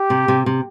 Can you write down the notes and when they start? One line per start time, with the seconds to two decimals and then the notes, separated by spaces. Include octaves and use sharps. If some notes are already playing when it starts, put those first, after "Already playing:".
Already playing: G4
0.10 C3
0.28 C3
0.46 C3